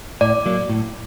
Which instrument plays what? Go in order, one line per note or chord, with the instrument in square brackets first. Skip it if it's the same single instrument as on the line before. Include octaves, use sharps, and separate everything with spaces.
[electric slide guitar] A2 [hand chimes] D5
[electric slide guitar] F#3 A#3
A2